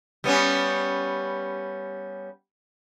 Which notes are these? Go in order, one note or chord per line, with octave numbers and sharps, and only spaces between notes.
G3 B3 C#4